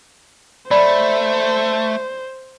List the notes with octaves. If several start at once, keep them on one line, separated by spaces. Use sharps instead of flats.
A3 C5 D5 B5